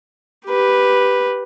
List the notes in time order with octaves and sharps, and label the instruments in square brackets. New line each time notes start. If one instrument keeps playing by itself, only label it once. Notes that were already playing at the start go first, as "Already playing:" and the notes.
[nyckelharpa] G4 B4